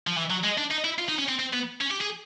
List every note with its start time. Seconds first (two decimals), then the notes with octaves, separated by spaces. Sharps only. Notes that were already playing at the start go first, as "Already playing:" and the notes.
0.07 F3
0.17 E3
0.30 F#3
0.44 G#3
0.58 D4
0.71 D#4
0.85 E4
0.99 F4
1.09 D#4
1.19 C#4
1.29 C4
1.39 C4
1.53 B3
1.81 C#4
1.91 G4
2.01 G#4